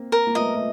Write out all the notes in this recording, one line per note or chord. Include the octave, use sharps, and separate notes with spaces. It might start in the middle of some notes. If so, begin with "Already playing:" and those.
Already playing: A#3 C4
A#4
A#3
A3 B3 D#5
A3